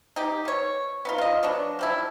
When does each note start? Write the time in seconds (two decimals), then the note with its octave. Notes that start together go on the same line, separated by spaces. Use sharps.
0.16 D#4 G4
0.45 B2 C#5
1.05 B3 D#4 F4
1.18 F4 D#5
1.43 F#3 B3 D4
1.79 F3 G3 E4